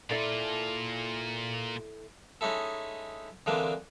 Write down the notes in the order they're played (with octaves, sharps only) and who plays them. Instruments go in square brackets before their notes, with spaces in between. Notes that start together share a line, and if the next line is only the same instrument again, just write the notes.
[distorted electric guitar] A#2 F4 [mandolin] E4 A4 D5
[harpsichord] G#3 C#4 D#4 E4 A4
D3 E3 G#3 A#3 C4 D4